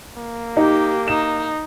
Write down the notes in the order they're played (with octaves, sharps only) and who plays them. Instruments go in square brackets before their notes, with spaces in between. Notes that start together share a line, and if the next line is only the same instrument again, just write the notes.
[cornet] A#3
[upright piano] D#4 [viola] G4
[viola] D#4 [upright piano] E7